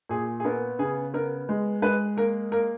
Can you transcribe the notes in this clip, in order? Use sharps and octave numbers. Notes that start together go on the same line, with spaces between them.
A#2 G#4
G#4
B3 A#4
C#3 G#4
B3 A#4
G#3
G#3 B4
A#3 A#4
A#3 A#4